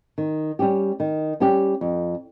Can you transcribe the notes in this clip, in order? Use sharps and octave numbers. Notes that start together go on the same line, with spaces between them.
D#3
G3 C#4 G4
D#3
G3 C#4 G4
F2